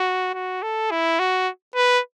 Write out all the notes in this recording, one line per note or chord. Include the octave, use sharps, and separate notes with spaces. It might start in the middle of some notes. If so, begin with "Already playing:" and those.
Already playing: F#4
F#4
A4
E4
F#4
B4